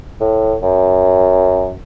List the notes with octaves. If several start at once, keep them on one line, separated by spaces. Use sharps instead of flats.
A2
F#2